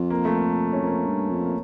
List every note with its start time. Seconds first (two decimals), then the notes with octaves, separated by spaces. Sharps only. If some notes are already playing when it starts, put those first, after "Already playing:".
Already playing: F2
0.10 A#3
0.25 A3
0.38 A#3
0.73 C#4
0.82 F2 A#3
1.06 G2
1.30 F2
1.45 A#3